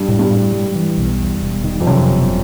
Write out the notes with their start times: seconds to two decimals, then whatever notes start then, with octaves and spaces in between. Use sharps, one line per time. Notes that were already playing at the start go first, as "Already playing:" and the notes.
Already playing: G2
0.08 A2
0.19 G2
0.31 A2
0.53 G3
0.75 E3
0.98 B1
1.20 E2
1.42 E1
1.64 D#3
1.80 F2
1.87 F#2 C3
2.09 E1